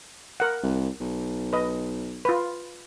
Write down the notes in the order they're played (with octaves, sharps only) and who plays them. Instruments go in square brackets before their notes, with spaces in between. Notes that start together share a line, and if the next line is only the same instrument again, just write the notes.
[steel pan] A#4 F#5
[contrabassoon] C2
B1
[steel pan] B4 D#5
F4 B4